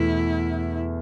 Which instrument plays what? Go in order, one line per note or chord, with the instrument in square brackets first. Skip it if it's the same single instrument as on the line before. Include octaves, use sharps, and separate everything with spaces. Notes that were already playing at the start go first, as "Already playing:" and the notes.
Already playing: [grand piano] E2 B2 A3 [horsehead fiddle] E4